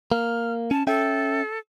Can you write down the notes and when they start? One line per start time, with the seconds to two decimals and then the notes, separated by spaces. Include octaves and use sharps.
0.12 A#3 F6
0.71 C#4 A5
0.87 C#4 A4 E5 G5